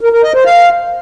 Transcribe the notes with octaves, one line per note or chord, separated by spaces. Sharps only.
A#4
A#4
D#5
C5
F5